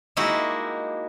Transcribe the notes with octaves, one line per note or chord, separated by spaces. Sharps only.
G#3 A#3 D#4 E4 F#4 G4